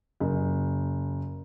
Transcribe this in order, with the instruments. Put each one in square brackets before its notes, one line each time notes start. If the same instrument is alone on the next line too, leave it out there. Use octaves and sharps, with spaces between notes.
[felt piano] F#1